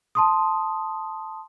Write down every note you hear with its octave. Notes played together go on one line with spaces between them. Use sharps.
A5 C6 D#6